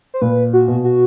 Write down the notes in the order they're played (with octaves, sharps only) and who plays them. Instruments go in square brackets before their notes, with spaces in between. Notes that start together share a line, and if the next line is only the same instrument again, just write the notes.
[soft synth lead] C5
[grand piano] A#2 [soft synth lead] B4
[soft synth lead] F#4
[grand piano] B2
[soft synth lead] F#4